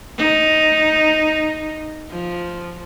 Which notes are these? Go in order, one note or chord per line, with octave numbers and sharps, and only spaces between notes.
D#4
F3